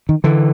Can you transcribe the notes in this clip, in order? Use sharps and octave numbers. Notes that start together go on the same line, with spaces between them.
D#3
D3 E3